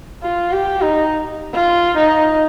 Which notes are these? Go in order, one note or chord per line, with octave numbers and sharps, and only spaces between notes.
F4
G4
D#4
F4
D#4